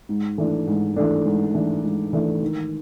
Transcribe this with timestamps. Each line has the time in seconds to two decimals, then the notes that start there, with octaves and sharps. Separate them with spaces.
0.09 G#2
0.38 E3 A3 D4
0.67 G#2
0.96 E3 A3 D4
1.25 G#2
1.54 E3 A3 D4
1.84 G#2
2.13 E3 A3 D4
2.42 D#3